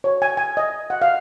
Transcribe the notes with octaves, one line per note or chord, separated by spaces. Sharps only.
C#5
G#5
G#5
D#5
F#5
F5